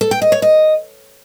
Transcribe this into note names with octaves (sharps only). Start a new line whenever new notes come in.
A4
G5
D#5
C#5
D#5